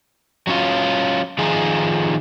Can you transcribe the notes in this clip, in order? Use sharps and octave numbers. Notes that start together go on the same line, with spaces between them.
F#3 C#4 F4
D#3 F3 D#4 F4 G#4